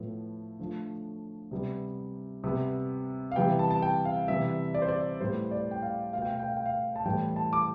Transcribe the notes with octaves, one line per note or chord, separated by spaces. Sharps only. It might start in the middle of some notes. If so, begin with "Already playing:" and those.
Already playing: A2 F3 B3
D3 F3 A3
C3 G3 B3
C3 G3 B3
F5
C3 E3 G3 B3 G5
A5
A5
G5
F5
C3 E3 G3 B3 E5
D5
C5
D5
A2 G3 B3 C5
D5
G5
F5
B2 A3 F5 G5
F5
G5
F5
G5
F5
A5
A2 E3 G3 B3 G5
A5
D6